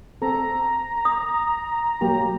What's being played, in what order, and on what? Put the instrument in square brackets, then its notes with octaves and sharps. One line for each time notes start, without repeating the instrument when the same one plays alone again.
[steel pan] C4 A4 [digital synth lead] A#5
[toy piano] D#6
[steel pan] F#3 A#3 G4